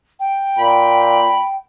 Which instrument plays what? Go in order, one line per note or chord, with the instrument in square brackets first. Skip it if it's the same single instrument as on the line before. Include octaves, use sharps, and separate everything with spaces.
[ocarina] G5
[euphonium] A#2 [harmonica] B5